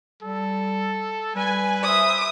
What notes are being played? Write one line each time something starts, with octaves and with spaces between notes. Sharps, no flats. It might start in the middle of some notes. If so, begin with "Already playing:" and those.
G3 A4
G3 B4 G#5
C5 E5 D#6